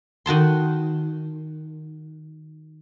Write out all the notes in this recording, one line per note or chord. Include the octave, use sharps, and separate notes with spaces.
D#3 F#4 A5 C6